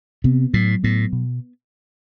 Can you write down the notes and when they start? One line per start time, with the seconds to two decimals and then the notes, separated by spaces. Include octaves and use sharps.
0.24 C3 B3
0.54 A2 F#3
0.83 A2 B3
1.13 B2